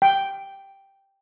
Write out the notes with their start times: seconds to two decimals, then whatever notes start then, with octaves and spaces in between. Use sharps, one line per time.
0.02 G5